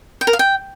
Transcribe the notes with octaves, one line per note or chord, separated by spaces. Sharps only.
G5
A#4
F5
G5